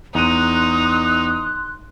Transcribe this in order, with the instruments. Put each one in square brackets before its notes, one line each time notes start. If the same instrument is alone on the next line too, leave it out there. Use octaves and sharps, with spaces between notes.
[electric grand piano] E2 D#7 [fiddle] D#4 [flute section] C6 F#6 [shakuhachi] D#6